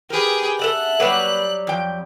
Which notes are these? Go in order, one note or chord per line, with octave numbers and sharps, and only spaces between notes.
G4 G#4 A#4 B4
A4 E5 F#5 F#6
F#3 G3 A#3 B4 F#5
F2 G5